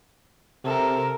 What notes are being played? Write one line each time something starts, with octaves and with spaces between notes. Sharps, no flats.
C3 A4 A#4